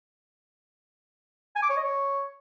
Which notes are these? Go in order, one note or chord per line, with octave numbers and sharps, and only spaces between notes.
G#5
D6
C#5
D#5
C#5